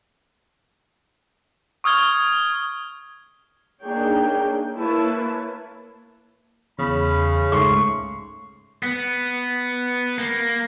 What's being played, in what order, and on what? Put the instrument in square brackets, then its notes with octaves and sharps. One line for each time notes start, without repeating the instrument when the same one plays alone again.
[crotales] C#6 D#6 F6 G#6 G7
[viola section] A#3 D4 D#4 G#4 C#5 G5
A#3 E4 B4 C#5 A5
[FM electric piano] E2 [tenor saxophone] C#3 [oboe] B5
[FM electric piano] C#2 G#2 A3 [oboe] C6 [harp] C#6
[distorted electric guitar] B3
A#3